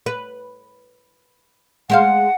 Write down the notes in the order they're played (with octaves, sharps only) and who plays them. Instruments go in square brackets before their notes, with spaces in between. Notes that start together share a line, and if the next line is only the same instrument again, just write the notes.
[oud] B4
[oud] G#3 C5 F5 [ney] F#5